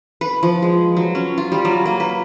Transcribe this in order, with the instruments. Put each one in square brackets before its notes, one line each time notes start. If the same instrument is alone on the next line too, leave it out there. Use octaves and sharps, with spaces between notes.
[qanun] B4
F3
G#3
F#3
C#4
F4
G3
F#3
A#3
B4